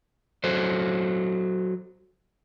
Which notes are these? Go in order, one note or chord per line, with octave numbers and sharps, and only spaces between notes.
F#3 A4 C5